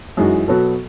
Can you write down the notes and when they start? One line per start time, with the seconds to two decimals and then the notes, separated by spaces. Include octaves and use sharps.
0.17 F#2 E3 G#3 D#4 F#4
0.48 B2 F#3 B3 F#4 A4